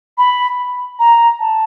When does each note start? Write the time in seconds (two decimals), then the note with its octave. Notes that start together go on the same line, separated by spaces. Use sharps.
0.18 B5
0.99 A#5
1.40 A5